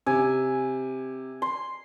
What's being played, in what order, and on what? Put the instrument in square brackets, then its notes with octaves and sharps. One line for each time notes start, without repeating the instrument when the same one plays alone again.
[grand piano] C3 [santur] G#5
[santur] C6